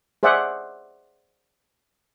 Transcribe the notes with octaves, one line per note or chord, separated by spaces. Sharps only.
G#4 C5 D5 E5 F#5